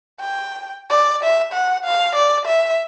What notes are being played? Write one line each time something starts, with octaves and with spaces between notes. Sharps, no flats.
G5
D5
E5
F#5
F5
D5
E5